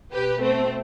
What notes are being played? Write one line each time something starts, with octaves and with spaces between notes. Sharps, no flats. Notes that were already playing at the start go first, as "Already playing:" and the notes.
B2 G4 B4
A3 C4